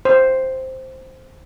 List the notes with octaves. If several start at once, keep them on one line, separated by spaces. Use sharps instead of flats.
C5